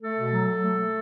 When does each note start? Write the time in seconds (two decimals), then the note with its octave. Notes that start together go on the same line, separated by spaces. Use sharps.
0.01 A3 A4
0.17 B2
0.32 F#3
0.48 F#3
0.63 A3
0.79 A3